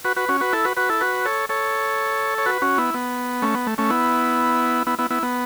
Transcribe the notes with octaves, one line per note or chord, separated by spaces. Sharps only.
F#4 B4
F#4 B4
C#4 F#4
F#4 B4
E4 A4
F#4 B4
F#4 B4
E4 A4
F#4 B4
A4 C#5
A4 C#5
C#5
F#4 B4
C#4 F#4
B3 E4
B3
A3 C#4
B3
A3
A3 C#4
B3 E4
B3 E4
B3 E4
B3 E4
B3